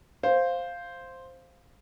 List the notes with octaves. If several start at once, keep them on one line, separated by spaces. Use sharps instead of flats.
C5 F5